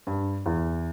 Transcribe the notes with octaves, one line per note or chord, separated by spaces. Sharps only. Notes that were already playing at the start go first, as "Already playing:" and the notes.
G2
E2